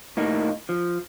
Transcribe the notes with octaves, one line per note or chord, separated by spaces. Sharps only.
A2 A#3 D#4
F3